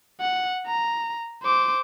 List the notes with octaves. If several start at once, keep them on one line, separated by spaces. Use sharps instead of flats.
F#5
A#5
C5 D6